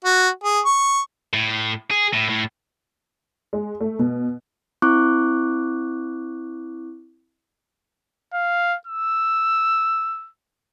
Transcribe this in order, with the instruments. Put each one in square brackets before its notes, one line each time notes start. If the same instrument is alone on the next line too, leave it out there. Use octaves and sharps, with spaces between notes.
[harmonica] F#4
G#4
C#6
[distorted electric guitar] A2
G#4
A2
A2
[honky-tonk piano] G#3
A3
B2
[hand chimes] C4 E4 C#6 D6 F#6
[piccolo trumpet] F5
E6